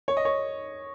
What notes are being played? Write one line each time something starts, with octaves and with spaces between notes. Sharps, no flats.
C#5
D#5
C#5